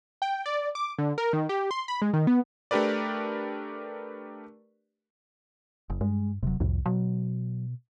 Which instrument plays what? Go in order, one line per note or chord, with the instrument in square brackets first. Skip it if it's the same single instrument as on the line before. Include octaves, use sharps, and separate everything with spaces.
[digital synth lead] G5
D5
D6
D3
A#4
D#3
G4
C6
B5
G#3
D#3
B3
[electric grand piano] A3 D4 G4 A#4 B4 D5
[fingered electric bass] F#1
[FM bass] G2 [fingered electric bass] G#3
[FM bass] D#1 [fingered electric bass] C3 F#3
[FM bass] C2 [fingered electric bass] F2 A2
[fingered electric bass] B2 [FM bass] F#3